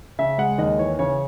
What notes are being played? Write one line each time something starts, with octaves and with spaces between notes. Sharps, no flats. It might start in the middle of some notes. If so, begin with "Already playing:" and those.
C#3 E5
G#3 F#5
D#2 D#5
E3 C#5
C#3 C#5